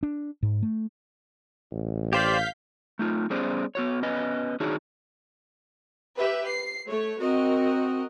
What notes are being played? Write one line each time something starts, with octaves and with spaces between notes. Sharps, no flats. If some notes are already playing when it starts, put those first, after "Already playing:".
D4
G#2
A3
A1
G4 C5 D5 F5 G6 B6
A3 D#4 F4
G3 B3 C#4 G#4 C5 D5
B3 F#4 C#5
B3 C#4 B4 D#5 G#5
D#3 D4 D#4 F#4 G#4 C#5
G4 B4 E5
C7
A3 C#5
C4 F#4 A#4 D#5